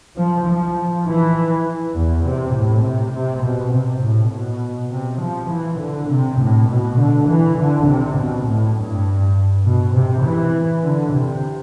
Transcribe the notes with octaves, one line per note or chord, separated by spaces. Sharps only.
F3
F3
E3
E2
C3
A2
C3
C3
B2
C3
A2
B2
C3
F3
E3
D3
C3
A2
B2
D3
E3
D3
C3
B2
A2
G2
B2
C3
E3
D3
C3